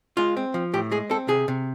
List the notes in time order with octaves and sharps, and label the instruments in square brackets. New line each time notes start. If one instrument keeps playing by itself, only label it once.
[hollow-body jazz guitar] G#3 F4
C4
F3
A2 G4
G#3 G#4
C4 A4
C3 G#4
C3